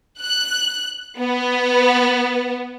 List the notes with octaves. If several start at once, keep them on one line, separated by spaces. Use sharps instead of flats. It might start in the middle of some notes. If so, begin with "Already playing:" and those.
F#6
B3